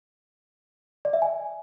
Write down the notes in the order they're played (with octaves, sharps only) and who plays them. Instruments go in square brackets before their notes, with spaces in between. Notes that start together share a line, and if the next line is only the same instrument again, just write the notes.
[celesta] D5
E5
G#5